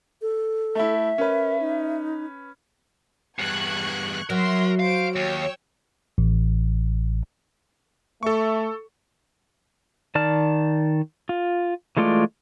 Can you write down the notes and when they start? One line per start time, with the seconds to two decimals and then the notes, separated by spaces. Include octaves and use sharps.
0.21 A4
0.75 A3 E4 E5
1.18 C#4 A#4 B4
1.60 D#4
3.39 E2 G2 C#6 F#6 G#6
4.30 F#3 A#4 E5 C6
4.79 C5 F5 D7
5.16 D#2 C#5 G5 E6
6.18 A1
8.23 A3 A4 C#6
10.15 D#3 D5 A5 F6
11.29 F4
11.97 E3 G#3 A3 F4 D5